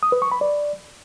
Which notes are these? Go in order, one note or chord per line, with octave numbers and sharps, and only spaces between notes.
D#6
B4
C#6
B5
D5